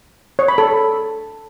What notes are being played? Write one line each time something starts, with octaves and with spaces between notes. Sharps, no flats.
C#5
B5
A4